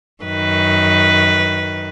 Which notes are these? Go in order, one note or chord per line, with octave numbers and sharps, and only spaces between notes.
F#2 D#3 B4